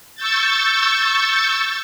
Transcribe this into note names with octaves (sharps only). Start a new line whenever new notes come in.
C#6 E6 G6 A6